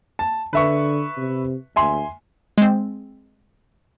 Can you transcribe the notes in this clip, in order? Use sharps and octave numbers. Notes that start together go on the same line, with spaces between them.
A5
D3 B4 E5 C#6
C3
D2 E5 G#5 C6
G#3 C4